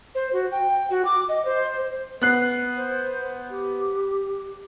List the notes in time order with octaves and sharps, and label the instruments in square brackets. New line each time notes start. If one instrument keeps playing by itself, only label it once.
[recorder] C5
F#4
G5
F#4
D6
D#5
C5
[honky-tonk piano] B3 F#6 C7
[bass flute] C5
G4